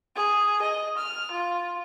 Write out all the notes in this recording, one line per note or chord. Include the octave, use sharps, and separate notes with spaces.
G#4
D#5
F6
F4